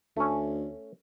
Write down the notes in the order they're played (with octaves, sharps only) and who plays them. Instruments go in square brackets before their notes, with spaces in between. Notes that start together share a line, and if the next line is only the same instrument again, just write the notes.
[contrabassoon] D2 [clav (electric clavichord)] A3 C#4